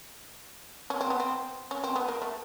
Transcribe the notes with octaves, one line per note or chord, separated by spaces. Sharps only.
C#4
C4
B3
C4
C#4
C4
B3
A#3
A3